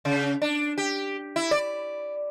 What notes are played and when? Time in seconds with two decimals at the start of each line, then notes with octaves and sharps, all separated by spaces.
0.05 C#3
0.42 D4
0.78 G4
1.36 E4
1.51 D5